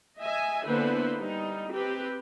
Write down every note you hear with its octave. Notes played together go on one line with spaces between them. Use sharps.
D#5 E5 G#5
D3 A#3 B3 E4 B4 C5
G3 D#4
C4 G4 B4